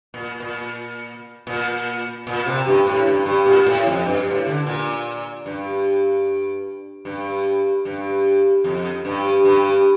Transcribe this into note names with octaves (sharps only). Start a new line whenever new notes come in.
A#2
A#2
A#2
A#2
C3
G2
A2
G2
G2
A#2
A2
F2
G2
A2
D3
A#2
G2
G2
G2
F2
G2
G2